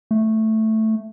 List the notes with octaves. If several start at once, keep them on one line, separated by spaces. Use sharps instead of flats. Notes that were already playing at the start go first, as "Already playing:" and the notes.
A3